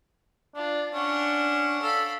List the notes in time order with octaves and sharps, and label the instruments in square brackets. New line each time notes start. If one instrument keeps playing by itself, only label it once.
[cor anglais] D4 [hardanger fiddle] F4
[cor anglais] C#4 [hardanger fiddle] D4 F#5
[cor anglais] A4 [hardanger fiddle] F5 B5